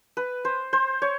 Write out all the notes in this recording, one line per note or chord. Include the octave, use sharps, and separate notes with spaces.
B4
C5
C5
C#5